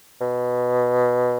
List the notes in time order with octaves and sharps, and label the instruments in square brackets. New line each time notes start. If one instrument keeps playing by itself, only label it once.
[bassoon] B2